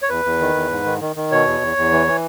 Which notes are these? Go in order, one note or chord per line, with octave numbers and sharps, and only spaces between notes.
C#5
E2 B4
E2
D#3
E2
G#2
D#3
D#3
D#3
B2 C#5
E2
E2
E2
E3
E3